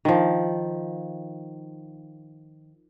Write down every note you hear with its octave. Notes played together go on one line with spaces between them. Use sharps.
D#3 F3